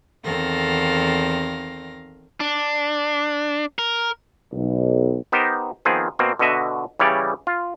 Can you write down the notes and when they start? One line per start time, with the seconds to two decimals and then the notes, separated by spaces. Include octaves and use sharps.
0.24 E2 D#3 C4 A4 F5 A#6
2.40 D4
3.79 A#4
4.52 B1
5.32 B3 D#4 G4 A#4 C5
5.85 D#3 F3 B3 C4 G#4
6.19 B2 A#3 C4
6.39 B2 D3 F#4 D#5 E5
7.00 C#3 E3 G3 C#5 D5
7.47 F4